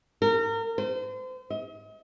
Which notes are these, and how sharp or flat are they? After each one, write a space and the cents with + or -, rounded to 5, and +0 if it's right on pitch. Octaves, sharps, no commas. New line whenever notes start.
A#4 -30
C5 -35
D#5 +40